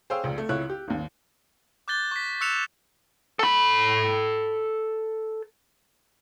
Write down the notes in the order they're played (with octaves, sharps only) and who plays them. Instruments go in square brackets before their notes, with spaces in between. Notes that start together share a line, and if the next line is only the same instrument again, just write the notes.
[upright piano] G#4 C5 C#5 F5 G5 E6
F1 C#2
A3
C#2 E4 C#5 F#6
G4
G#1 D#2
[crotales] D6 F#6 G6 A6 G7
C#6 B6
C#6 E6 F#6 C#7 E7 F7
[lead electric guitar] A4 B5